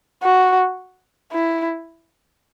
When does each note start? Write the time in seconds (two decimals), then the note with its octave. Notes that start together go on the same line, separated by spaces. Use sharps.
0.23 F#4
1.32 E4